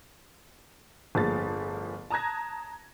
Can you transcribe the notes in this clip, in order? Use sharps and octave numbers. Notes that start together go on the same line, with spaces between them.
G1 A2 F3 A#3 G#4 A6
A5 A#5 D#6 F#6 G#6 A#6